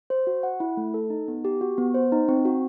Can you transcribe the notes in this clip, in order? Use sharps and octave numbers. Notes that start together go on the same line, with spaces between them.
C5
F#4
F#5
E4
A3
A4
D#4
B3
G4
F#4
B3
C5
D#4
C4
F#4